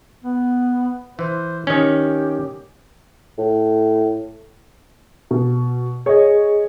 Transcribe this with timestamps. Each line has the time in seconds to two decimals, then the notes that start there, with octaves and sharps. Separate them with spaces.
0.24 B3
1.19 E3 C5
1.67 D#3 C#4 G4
3.38 A2
5.31 B2
6.06 G#4 C#5 D#5